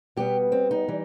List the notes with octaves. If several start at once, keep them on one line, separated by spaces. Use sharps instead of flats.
B2 G3 B3 G4
C4
D#4
E3 G3